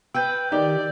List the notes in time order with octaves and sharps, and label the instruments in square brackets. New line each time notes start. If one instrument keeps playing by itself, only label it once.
[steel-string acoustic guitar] B4 G5 [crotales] E6 G6
[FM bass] D#3 [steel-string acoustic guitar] G4 [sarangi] D5